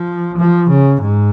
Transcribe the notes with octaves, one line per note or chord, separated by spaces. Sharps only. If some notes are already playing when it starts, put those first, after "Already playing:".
Already playing: F3
F3
C#3
G#2